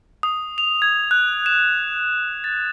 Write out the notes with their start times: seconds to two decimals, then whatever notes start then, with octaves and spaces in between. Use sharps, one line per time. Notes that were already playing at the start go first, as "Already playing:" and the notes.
0.23 D#6
0.58 F7
0.82 G#6
1.11 F#6
1.46 E7
2.44 A6